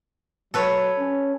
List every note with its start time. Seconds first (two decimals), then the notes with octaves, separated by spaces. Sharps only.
0.54 F#3 A4 B4 C#5
0.98 C#4